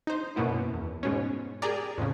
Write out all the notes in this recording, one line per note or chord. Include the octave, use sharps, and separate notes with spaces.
D#4 C5
F#2 B2 A#3 B3 E4
E2
G#2 B2 C#4
G4 G#4 A#4 D5
F2 A2 C#3